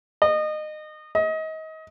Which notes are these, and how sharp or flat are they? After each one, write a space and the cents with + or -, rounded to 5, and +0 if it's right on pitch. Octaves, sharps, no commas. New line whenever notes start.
D#5 -25
D#5 +30